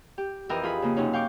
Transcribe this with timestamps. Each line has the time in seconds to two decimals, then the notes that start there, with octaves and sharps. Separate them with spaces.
0.18 G4
0.49 F2 E3 G4 A#4 B4 D#5
0.63 F4 G#4 B5
0.82 C#3 A#3
0.96 F#2 C3 C#4 D#4
1.13 F5 G5 C#6 D6